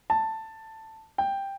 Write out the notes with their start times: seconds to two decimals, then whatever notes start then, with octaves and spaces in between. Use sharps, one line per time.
0.10 A5
1.18 G5